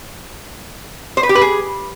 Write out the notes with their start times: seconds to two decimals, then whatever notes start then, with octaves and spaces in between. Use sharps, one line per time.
1.17 C5
1.23 B4
1.29 G4
1.35 B4
1.41 G#4